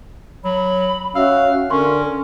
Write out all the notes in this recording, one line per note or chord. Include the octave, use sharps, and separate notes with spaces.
F#3 B5
C#4 F#4 E5 F5 E6
D3 C#4 A#4 C6 C#6